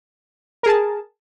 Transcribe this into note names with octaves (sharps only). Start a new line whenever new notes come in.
G#4 A#4 A5